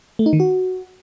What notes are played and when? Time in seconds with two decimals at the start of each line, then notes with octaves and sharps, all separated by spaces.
0.19 A3
0.26 D#4
0.33 D#3
0.40 F#4